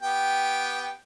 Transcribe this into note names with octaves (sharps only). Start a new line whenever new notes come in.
B3 G4 G5